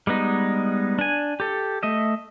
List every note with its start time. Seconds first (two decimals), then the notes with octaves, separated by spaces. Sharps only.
0.07 G3 G#3 B3 D#4
0.99 D4 G#5
1.40 G4 A4
1.83 A3 D#5 E5